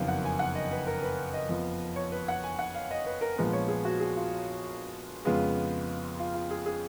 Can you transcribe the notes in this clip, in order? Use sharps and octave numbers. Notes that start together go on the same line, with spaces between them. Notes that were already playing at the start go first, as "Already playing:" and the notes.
Already playing: F#1 F2 D#3 F#3 B3 F5
F#5
G#5
F#5
D#5
B4
A#4
B4
D#5
F2 F3 B3
C#5
B4
F#5
G#5
F#5
F5
D#5
B4
A#4
A#1 A#2 F3 G#3 B3 B4
C#5
G#4
F#4
G#4
F4
F2 C#3 G#3 B3 F4
F4
F4
G#4
G#4